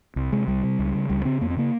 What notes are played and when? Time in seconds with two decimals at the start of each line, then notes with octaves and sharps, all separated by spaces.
0.16 C2
0.32 C3 G#3
0.48 C2 G3
0.63 C3
0.79 C#2
0.95 C#3
1.10 C#2 G3
1.25 C#3 C4
1.41 F2 A#3
1.50 C4
1.57 C#3 A#3